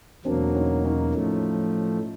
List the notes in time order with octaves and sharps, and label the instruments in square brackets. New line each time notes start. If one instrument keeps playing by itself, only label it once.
[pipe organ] E2 B2 F#3 A#3 [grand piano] C4 D4
[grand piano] C#4 D#4
C#4 D#4
[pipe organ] A2 F3 A3